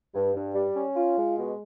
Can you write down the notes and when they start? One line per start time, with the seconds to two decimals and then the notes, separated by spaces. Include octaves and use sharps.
0.14 G2
0.35 G2
0.55 G3
0.75 C#4
0.95 F4
1.16 G#3
1.37 B2